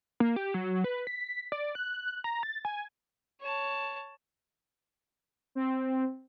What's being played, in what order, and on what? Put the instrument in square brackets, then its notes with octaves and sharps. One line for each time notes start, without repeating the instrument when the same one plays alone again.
[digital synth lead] A#3
G4
F#3
B4
B6
D5
F#6
A#5
A6
G#5
[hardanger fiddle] C#5 A5
[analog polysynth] C4